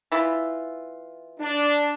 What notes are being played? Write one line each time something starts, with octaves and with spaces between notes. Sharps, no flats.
E3 E4 F4
D4